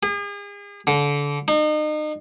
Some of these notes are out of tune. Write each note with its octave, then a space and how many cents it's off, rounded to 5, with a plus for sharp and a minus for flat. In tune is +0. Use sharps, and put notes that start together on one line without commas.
G#4 -40
D3 -30
D#4 -35